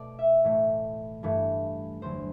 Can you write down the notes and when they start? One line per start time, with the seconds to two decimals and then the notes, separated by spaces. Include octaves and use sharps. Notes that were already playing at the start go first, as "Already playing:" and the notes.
Already playing: B2 A3 D5
0.19 E5
0.44 A2 E3 A3
1.23 G2 E3 A3
2.02 E2 D3 F#3 C5